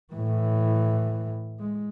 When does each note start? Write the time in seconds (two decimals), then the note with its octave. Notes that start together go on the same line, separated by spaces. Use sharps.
0.13 A2 E3
1.60 G#3